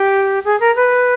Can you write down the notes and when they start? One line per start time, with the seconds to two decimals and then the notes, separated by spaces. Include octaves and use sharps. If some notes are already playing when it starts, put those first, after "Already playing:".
Already playing: G4
0.45 G#4
0.60 A#4
0.76 B4